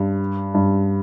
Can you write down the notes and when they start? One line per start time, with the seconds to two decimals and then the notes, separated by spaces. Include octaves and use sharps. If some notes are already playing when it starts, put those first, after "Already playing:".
Already playing: G2
0.54 G2